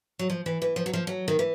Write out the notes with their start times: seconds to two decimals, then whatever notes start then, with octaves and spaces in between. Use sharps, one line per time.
0.19 F#3
0.30 F3
0.46 E3
0.62 E3
0.76 F3
0.86 F#3
0.93 F3
1.07 F#3
1.28 D#3
1.39 E3